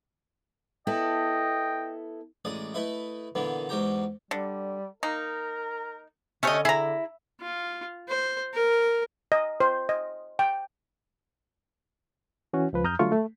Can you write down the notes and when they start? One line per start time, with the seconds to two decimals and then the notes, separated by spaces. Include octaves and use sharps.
0.87 B3 E4 A4 D#5 G5
2.45 A1 G#3 D5 D#6
2.74 A3 E4 B4 D#5 E5
3.35 A#2 D3 E3 B3
3.69 E2 G#2 F#4 G4 G5 A#5
4.31 D3 G3
5.03 A#3 D#4 A#4
6.43 D3 A3 C#4 G4 C#5 D#5
6.65 E4 G#4 A#5
7.41 F4
8.09 C5
8.54 A#4
9.32 D#5
9.60 C5
9.89 D#5
10.39 G5
12.53 E3 C#4 F#4
12.73 C#2 F3 B4
12.84 F2 A#5 D#6 F6 G6
12.99 D3 F#3 G3 A3 F4 C#6
13.12 A3